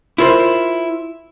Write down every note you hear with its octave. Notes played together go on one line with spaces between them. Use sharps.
E4 F4 A#4 C5